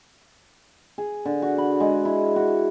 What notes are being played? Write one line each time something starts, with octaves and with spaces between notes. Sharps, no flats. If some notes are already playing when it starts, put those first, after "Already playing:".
G#4
D3
F#4
B5
G#3
E4
F#4